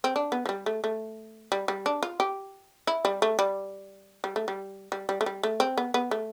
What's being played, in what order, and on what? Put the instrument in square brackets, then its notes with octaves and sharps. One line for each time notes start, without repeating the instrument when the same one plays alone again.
[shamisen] C4
D4
B3
F3
G3
A3
A3
G3
G3
D4
F4
G4
E4
G3
A3
G3
G3
A3
G3
G3
G3
A3
G3
A3
C4
B3
B3
A3